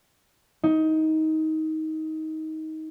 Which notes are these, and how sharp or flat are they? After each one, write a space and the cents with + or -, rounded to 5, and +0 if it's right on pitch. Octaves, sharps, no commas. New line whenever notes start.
D#4 +20